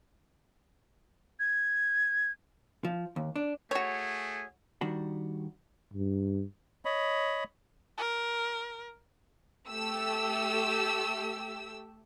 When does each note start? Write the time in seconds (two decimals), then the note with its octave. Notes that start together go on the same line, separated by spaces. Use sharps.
1.40 G#6
2.85 F3
3.16 D#2
3.36 D4
3.71 A3 F#4 G#4 C#5 G#5
4.81 D#3 G3 D4 F#4
5.94 G2
6.85 C#5 D#5 B5
7.98 A#4
9.68 A3 G4 E6